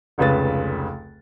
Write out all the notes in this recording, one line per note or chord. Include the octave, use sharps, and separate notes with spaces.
F1 C#2 C#3 B4 A6